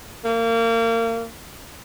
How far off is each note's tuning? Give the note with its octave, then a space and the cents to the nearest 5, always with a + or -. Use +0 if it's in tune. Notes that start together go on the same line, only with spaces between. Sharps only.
A#3 -30